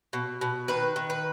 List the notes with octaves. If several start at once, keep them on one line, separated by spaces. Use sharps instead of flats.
B2
B2
D#3 B4
D#3
B4